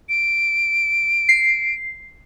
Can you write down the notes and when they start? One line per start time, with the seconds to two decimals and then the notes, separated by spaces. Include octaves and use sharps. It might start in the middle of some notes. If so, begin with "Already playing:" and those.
0.09 D7
1.29 C7